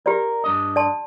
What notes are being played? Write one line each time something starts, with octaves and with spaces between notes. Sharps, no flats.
G4 A#4 D5
G2 D4 D#5
D5 A5 C6